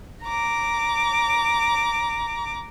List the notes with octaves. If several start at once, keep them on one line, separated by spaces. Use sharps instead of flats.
A#5 D6